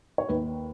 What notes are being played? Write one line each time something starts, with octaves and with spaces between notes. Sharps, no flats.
C#5
D#2 B4